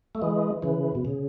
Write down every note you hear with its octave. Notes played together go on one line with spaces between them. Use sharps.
A3
E3 G#3
C#3 E3
B2
C#3